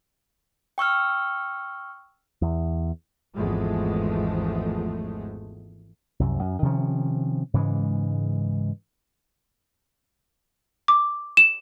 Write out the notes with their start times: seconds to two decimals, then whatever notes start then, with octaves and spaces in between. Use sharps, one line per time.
0.78 G5 C#6 E6 F6
2.42 E2
3.36 G#1 E2 F3 G#3 A3
6.19 C2 F#2 C3
6.39 F#2
6.62 C3 D#3 F3 C#4
7.54 G#2 C#3 E3 G#3
10.88 D6
11.37 E7